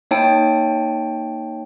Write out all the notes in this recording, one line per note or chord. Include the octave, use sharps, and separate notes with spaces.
A#3 D#4 C#5 G5 A5 D7